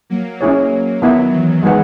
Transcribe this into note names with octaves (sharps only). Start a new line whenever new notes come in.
F#3 A#3
C#4 E4 G#4 C#5
D#3 F#3 B3 E4 A#4 E5
E3
G#3 D#4 G#4 B4 F#5